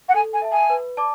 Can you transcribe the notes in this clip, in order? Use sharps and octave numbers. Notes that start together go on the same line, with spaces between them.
F#5
A4 G#5
G#5
E5 A5
G#5
B4
D5 A5 D6